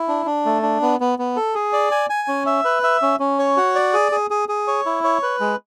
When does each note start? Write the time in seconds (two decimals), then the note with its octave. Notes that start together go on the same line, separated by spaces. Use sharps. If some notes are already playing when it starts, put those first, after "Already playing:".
Already playing: E4
0.08 D4
0.26 D4
0.45 A3
0.63 D4
0.82 B3
1.00 B3
1.19 B3
1.36 A4
1.55 G#4
1.73 D5
1.91 G#5
2.10 G#5
2.28 C#4
2.46 E5
2.65 B4
2.84 E5
3.02 C#4
3.20 C#4
3.39 C#5
3.57 F#4
3.75 D5
3.94 G#4
4.12 G#4
4.31 G#4
4.49 G#4
4.68 C#5
4.86 E4
5.04 C#5
5.23 B4
5.40 G#3